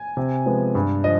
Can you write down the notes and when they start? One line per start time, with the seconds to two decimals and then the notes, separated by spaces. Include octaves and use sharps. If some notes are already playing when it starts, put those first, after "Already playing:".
Already playing: G#5
0.17 C3
0.46 F3 G#3 B3
0.75 G2
1.04 F3 D#5